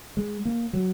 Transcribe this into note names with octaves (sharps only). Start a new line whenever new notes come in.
G#3
A#3
F#3